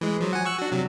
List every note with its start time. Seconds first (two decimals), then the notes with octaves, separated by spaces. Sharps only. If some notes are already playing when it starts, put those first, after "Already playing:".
0.01 E3 G#3
0.21 F3 F#3
0.33 F#5 G#5
0.45 C#6 E6 F#6
0.59 D4 F#4
0.72 C3 F#3